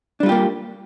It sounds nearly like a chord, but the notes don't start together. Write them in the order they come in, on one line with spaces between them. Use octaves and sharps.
D4 G3 F4 G4 A#3